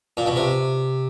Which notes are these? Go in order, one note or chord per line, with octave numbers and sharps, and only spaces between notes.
A#2
B2
C3